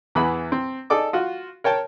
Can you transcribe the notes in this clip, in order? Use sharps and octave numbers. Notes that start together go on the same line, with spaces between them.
E2 E3 G#4 E5 B5
C4
D#4 G#4 A4 D5 D6
F4 F#4
A#4 C#5 G5 A5